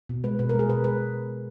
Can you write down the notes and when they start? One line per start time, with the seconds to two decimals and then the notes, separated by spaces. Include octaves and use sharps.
0.09 B2
0.24 G#3 B4
0.39 B2 B4
0.49 A#4
0.54 G#3
0.59 G#4
0.69 B2 B4
0.84 G#3 B4